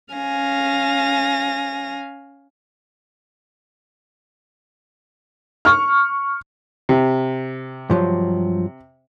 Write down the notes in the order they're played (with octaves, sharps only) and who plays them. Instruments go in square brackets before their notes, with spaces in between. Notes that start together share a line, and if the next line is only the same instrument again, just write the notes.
[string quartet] C#4 F5 G#5 A#6
[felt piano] C#6 F6
[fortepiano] C3
[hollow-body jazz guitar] G2 F3 F#3